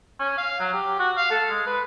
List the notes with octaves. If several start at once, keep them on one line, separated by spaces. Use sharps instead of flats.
C#4
F5
F#3
G4
F#4
F5
A4
G#3
B4